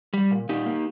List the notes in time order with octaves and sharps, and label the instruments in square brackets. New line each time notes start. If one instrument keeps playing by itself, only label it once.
[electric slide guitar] G3
A#2
A#2 D#4 G4
A#3